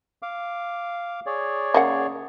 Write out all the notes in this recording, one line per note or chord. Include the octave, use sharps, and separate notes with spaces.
F5 D6
G#4 C#5 D5
C#3 A#3 F#5